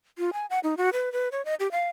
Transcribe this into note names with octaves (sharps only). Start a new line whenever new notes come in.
F4
G#5
F#5
D#4
F#4
B4
B4
C#5
D#5
G4
F5